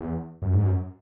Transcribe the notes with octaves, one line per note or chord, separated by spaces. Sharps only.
E2
F#2
G#2
F#2